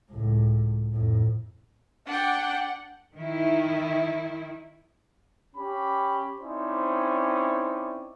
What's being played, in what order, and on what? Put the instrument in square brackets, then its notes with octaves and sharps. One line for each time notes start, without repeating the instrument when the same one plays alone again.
[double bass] C#2 A2
F2 A2
[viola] D4 G5 [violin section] F#5
[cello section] D#3 E4
[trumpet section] C#4 G4 B5
C4 C#4 D#4 E4 C5 D5